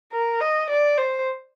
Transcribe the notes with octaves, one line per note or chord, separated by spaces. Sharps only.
A#4
D#5
D5
C5